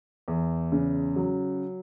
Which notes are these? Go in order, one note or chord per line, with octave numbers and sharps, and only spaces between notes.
E2
C#3
F#3